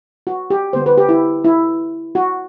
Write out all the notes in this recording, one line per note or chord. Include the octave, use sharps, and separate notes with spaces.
F#4
G4
D3 G3 B3 C5
B4
G4
E4
E4
F#4